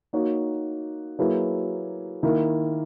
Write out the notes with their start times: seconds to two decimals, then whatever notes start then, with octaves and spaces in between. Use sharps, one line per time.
0.13 A#3 D#4 F#4 C#5
1.19 F#3 A#3 E4 G#4 B4
2.23 D#3 A#3 E4 A#4